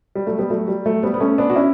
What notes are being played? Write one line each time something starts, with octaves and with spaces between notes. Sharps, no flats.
G3
F#3 A3
G3 B3
F#3 A3
G3
F#3 A3
G3 B3
B3
A3 C#4
B3 D4
F#4
C#4 E4